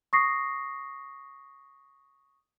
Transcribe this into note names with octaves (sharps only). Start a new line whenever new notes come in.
C#6 D#6 A#6 C7